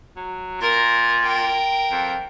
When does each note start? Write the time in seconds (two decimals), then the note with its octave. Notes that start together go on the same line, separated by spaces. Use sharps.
0.17 F#3
0.61 A#2 A#4
1.23 A#4 G5
1.91 F2